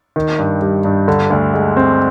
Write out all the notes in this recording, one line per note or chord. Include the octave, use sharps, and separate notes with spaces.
D#3
G2
G3
G2
D3
D2
G#3
C4